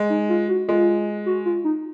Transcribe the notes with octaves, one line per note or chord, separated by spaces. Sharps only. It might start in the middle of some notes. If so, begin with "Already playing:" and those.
Already playing: G#3
D#4
F4
F#4
G#3 F4
F#4
F4
D#4